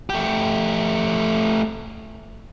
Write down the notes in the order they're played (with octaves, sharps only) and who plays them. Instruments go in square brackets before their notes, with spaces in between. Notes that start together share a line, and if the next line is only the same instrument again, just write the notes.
[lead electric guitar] A3 G4